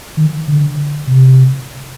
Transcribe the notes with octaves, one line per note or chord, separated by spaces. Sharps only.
D#3
D3
C3